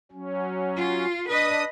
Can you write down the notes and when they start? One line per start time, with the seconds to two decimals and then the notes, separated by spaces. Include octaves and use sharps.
0.12 F#3 C#4
0.77 F4
1.28 D4 B4 D#5 D#6